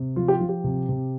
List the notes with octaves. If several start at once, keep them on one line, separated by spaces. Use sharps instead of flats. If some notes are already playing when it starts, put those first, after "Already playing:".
Already playing: C3
F3 F4
G4
F4
F3
G4
C3
C3